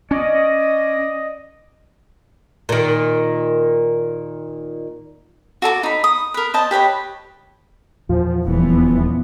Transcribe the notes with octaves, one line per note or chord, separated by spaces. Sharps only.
C#4 D5 D#5
A#2 D#3
F#4 A4 A5 D6
D#4 B5
D#6
A#4 B4
C5 D#5 A5
G4 B4 C#5 D#5
E2 A#2 F3
D#1 E3 F3 B3